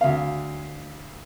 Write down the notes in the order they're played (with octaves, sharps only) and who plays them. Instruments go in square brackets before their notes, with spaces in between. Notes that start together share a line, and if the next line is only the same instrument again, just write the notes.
[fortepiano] D2 F5